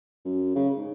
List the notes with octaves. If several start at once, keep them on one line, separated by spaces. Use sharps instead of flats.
F#2
C#3
G#2